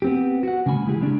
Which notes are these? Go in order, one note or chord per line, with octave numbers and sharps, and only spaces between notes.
B3 C4 G4
F#4 F#5
C#3 G#3 A#3 G#5 B5
E3 G#3 E4 G4 G#4
C#3 G#3 C#4 D4